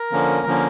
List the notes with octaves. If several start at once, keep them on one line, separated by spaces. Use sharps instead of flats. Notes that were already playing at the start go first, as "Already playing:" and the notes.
Already playing: A#4
D3 F3 A#3 C#4
D3 F3 A#3 C#4